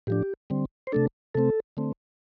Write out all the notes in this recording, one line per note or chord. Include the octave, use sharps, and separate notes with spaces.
A2 F3 D4 G4
D3 G3 C4
C5
C3 A3 D4 A4
C3 A3 C4 A4
D3 A3 C4